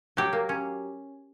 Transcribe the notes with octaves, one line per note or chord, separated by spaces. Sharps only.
F#3 G4
A#3
C#4